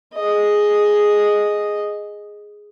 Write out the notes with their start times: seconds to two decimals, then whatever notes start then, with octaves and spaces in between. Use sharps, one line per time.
0.14 G#4 D#5